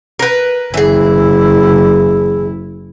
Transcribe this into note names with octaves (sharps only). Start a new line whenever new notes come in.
A#4 B4
F#1 E3 E4 G#4